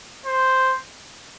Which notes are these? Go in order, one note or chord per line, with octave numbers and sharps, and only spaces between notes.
C5